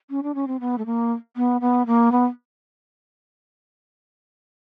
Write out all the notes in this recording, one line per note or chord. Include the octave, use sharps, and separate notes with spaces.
C#4
D4
C#4
C4
B3
A3
A#3
B3
B3
A#3
B3